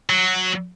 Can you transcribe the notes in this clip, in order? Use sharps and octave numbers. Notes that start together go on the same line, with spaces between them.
F#3